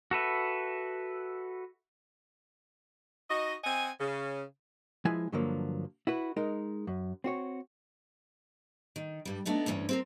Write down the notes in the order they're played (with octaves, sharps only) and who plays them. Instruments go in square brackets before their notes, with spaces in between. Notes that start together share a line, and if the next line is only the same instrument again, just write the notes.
[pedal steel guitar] F#4 A4 B4 E5
[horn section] D#4 F#4 D#5
C4 D#5 F#5 G#5
C#3
[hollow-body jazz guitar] F3 G#3 E4 B4 G#5
G2 D3 F3 F#3 A#3
E4 F#4 B4
G#3 D#4 A#4
F#2
C4 F#4 C#5
[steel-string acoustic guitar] D#3
G2 G3
A3 B3 D4 D#4
D2 G2 E3 C#4
C4 G#4 A#4